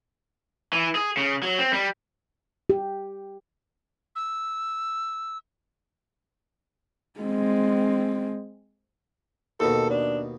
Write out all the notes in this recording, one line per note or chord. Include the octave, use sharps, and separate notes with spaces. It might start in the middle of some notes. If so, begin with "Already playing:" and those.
E3
G#4
C#3
F#3
C4
G3
G4
E6
G#3 C4
D#2 B2 A4
D4